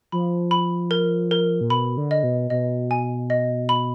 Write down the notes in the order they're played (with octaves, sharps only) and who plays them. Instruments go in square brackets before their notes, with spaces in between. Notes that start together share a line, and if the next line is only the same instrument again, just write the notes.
[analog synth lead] F3 [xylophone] B5
[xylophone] B5
A#4
A#4
[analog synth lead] A#2
[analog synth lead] B2 [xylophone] B5
[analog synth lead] D3
[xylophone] D#5
[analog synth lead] B2
[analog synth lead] B2 [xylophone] D#5
[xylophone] G#5
D#5
B5